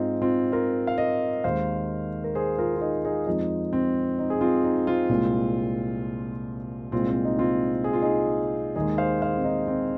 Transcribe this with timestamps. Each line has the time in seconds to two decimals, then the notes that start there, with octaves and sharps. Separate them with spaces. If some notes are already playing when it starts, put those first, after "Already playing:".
Already playing: G#2 G#3 C4 D#4 F4
0.22 C4 F4
0.52 F4 A#4
0.87 F5
0.98 A#4 D#5
1.44 D#2 D#3 G#3 C5 F5
2.24 A#4
2.35 G#4 C5
2.58 F4 A#4
2.76 F4
2.81 D#4 G#4
3.05 D#4 G#4
3.27 F2 F3 G#3 D#4
3.73 C4
4.19 D#4
4.30 G#4
4.41 C4 F4
4.64 D#4
4.87 C4 F4
5.09 C2 A#2 G#3
6.92 C2 A#2 G#3 C4 F4
7.11 C4
7.25 D#4
7.39 C4 F4
7.84 G#4
7.93 F4
8.02 D#4 G#4
8.76 D#2 D#3 G#3 D#4 G#4
8.98 C5 F5
9.22 C5 F5
9.37 C4
9.44 D#4
9.68 C4